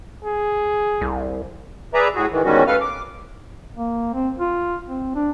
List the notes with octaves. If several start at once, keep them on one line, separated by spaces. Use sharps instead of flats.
G#4
C2
G#4 B4 D5 E5 A#5
A2 F#4 G#4
G#2 D#3 E3
E2 G#2 D#3 G3 C#4 F#4
A3 A4 B4 F5 F6
D6
A#3
C4
F4
C4
D4